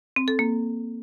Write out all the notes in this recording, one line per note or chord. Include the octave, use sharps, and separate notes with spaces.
C4
A4
A#3